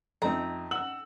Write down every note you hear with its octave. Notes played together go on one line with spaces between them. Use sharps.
F2 A3 C4 D#4 A#5
F#5 E6 F#7